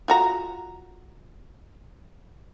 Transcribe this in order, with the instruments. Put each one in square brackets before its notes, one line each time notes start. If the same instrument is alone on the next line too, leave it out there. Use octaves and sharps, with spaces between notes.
[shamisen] F4 F#4 A#5